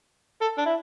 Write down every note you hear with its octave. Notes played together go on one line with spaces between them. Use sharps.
A4
D4
E4